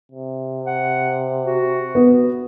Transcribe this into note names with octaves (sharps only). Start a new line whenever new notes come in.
C3
F#5
F#4
B3